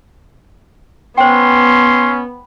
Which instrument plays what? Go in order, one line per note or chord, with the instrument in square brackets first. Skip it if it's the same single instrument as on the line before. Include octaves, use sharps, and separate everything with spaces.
[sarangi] B3 [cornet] C#4 [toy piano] C5 G5 [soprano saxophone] C6